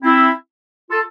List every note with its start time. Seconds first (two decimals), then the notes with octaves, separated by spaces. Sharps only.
0.03 C4 E4
0.91 F4 A4